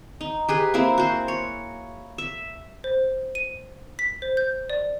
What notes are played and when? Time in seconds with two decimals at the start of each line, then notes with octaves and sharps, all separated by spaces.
0.21 D#4
0.48 G4 G#4 B4
0.74 A#3 C4 E4 G#4
0.98 F#4 C5
1.28 C#5
2.18 E5
2.84 C5
3.35 D#7
3.99 B6
4.22 C5
4.37 G6
4.70 D5